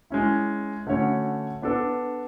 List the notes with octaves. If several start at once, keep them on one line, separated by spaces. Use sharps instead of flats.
G#3 C#4 E4
D3 A3 C#4 F#4 C#5
B3 D4 A4